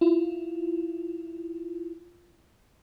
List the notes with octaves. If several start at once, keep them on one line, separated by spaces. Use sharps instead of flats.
E4 F4